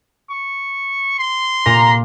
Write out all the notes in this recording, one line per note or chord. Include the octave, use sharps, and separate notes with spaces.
C#6
C6
A#2 A#5